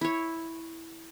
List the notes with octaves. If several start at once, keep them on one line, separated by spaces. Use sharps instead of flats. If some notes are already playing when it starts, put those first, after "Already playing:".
E4 C#5